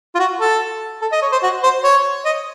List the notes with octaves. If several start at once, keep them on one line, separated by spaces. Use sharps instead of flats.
F4
F#4
A4
A4
D#5
C#5
C5
F#4
C5
C#5
D#5